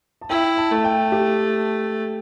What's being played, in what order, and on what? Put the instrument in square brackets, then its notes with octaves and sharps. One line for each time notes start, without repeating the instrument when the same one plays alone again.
[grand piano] A5
[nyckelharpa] E4 [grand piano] G5
[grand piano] A5
[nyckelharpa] A3 [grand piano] E5
[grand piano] G5
G4